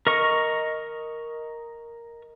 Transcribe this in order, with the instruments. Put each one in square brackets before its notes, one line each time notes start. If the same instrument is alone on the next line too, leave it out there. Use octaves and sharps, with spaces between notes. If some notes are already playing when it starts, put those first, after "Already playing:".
[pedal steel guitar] A#4 D#5 C#6